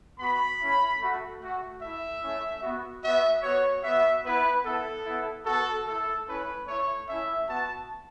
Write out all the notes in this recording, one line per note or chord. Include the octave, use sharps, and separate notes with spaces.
B3 F#4 B5
A3 C#4 E4
A3 F#4
A3 F#4
A3 E4 E5
A3 C#4 E4
B3 F#4
B3 F#4 E5
B3 F#4 C#5
B3 F#4 E5
B3 E4 B4
B3 E4 A4
B3 E4
B3 F#4 A4
A3 E4 A4
A3 C#4 E4 B4
A3 E4 C#5
A3 C#4 E4 E5
B3 F#4 A5